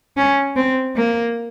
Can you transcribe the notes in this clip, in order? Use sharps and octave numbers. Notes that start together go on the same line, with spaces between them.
C#4
C4
A#3